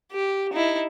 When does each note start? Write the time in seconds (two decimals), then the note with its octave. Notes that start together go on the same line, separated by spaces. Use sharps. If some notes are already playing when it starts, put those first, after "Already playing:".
0.12 G4
0.53 D#4 E4